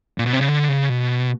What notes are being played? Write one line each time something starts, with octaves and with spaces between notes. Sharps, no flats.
A#2
B2
C3
C#3
D3
C#3
B2